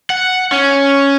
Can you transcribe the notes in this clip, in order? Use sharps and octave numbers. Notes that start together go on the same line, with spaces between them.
F#5
C#4